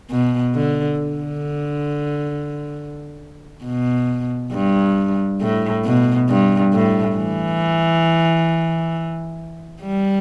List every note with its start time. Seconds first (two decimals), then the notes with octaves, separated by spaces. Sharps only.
0.10 B2
0.55 D3
0.99 D3
3.64 B2
4.53 G2
5.41 A2
5.85 B2
6.29 G2
6.73 A2
7.17 E3
9.82 G3